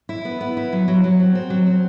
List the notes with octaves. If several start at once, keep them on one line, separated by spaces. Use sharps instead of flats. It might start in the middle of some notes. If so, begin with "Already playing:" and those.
E4
B3
B3
E4
F#3
F#3
F#3
C4
C4
F#3
C4